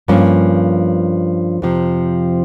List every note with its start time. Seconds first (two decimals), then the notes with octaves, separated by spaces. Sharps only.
0.08 G2 F3 A#3 C#4
1.62 F2 C3 F3